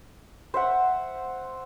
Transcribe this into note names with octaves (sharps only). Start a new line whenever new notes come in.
C5 E5 F#5